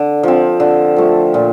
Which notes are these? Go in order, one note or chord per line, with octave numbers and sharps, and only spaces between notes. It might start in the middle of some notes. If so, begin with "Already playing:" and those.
Already playing: D3
F3 C4
D3
F3 A3
A#2